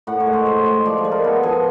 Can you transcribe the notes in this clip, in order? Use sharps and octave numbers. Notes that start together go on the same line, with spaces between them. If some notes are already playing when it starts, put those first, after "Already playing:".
A2 F#5
C#5
G#3
C5
A2 C5
G#3
F3 D5
D5
G#3
A#4
B3 A4
F3 G#4